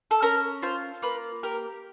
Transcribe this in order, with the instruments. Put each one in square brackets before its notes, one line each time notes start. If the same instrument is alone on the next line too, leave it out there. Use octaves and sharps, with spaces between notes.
[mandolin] A4
C#4 A#4
F4 C5
A#3 B4
G4 A#4